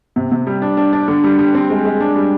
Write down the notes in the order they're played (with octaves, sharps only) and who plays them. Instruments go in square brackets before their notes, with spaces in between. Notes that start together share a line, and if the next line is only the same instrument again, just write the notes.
[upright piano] C3
C3
G3
D4
D4
D4
D3
G3
G3
C4
G#3
G#3
D4
G3